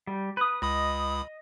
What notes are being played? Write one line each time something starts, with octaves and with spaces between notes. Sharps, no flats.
G3
B4 D#6
C#2 D#5 B5 D#6